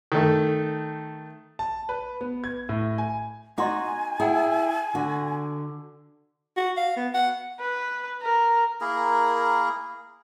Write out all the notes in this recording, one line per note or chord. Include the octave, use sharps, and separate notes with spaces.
D#3 A3
A5
B4
B3
G#6
A2
G#5
D#4 F#4 D#5 G#5 C6 D6
E4 G#4 F#5 G5 A#5
D3 F#4
F#4
F5
B3
F#5
B4
A#4
A#3 E4 G#4 A#4